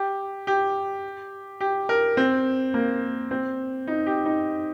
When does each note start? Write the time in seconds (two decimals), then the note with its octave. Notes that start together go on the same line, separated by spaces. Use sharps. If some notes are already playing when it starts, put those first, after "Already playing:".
Already playing: G4
0.47 G4
1.61 G4
1.89 A#4
2.17 C4
2.74 A#3
3.31 C4
3.87 D#4
4.07 G4
4.25 D#4